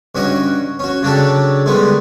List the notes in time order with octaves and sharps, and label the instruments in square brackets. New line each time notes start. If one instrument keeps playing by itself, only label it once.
[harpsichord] G2 C#4 F#4 D#5 F#5
C#4 F#4
C#3 F#3 D4 G4 A4
D3 D#3 G3 G#3 B3